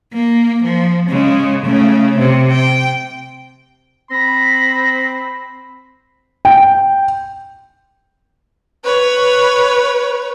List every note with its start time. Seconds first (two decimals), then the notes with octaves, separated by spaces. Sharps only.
0.13 A#3
0.63 F3
1.09 C#3 G#3
1.65 C#3 A3
2.18 C3
2.51 G5
4.11 C4 B5 A#6
6.45 G5
8.84 B4 C#5